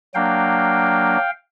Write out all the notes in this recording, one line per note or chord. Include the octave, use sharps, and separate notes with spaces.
F#3 A#3 D4 F5 G5